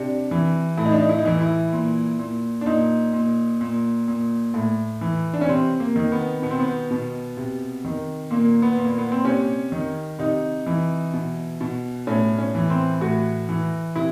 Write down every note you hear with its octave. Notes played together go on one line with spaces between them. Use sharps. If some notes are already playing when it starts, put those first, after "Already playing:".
Already playing: C3 D4
E3
A2 E4
D#4
D4
D#4
E4
D#4
E3 E4
E4
A#2
A#2
D4
A#2 D#4
A#2
A#2
A#2
A2
E3
D4
C#4
C3 C4
A#3
D#3
B3
B2 B3
C4
B3
B2
C3
D#3
A#2 A#3
B3
A#2
A#3
B3
C4
C3 C#4
D#3
C3 D#4
E3
B2
B2
A2 C#4
C#4
E3
C4
A2 F#4
E3
C3 E4